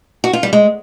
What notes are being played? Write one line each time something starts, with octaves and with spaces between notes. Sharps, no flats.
F#4
F4
G3
G#3